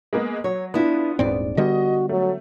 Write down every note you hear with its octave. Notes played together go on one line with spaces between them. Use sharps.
G#3 A#3 B3
F#3 C#5
B3 D4 E4 F4
D#1 G#2 C4 D5
D3 G3 B3 F#4 D#5
F#3 A3